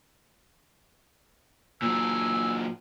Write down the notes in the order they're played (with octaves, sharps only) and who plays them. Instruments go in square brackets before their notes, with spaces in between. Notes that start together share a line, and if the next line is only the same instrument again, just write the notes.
[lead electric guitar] A#2 F#3 [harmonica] G#5 E6